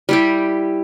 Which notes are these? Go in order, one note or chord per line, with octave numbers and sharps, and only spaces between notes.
G3 E4 G4